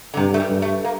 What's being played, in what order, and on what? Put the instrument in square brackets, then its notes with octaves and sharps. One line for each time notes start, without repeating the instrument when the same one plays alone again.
[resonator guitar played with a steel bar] D3
[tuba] G2 [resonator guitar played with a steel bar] C3
[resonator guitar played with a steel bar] A3
G3
[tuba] G2
[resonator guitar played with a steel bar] A3
A#3